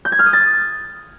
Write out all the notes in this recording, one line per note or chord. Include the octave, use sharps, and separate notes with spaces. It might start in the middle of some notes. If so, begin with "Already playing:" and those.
G6
G#6
F6
D#6
A6